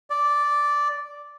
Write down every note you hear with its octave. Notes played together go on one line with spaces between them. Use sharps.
D5